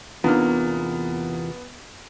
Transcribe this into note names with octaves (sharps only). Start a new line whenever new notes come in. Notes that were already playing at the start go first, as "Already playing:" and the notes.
E2 C3 A#3 B3 D4 D#4 F4 F6